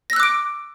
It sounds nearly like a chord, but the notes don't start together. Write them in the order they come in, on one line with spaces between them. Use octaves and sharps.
A#6 E6 F#6 D6 D7